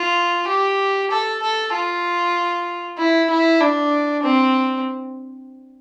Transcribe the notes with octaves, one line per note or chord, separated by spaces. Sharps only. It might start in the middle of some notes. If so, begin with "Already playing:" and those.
Already playing: F4
G4
A4
A4
F4
E4
E4
D4
C4